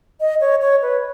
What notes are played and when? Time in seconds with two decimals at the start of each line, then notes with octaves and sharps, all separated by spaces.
0.21 D#5
0.41 C#5
0.61 C#5
0.82 B4